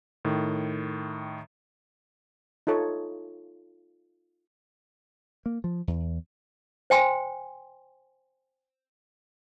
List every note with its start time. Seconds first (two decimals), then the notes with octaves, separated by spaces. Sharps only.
0.25 A2 D#3
2.67 D#4 F4 A4 C#5
5.46 A#3
5.64 F3
5.88 E2
6.90 C5 G5 G#5 C6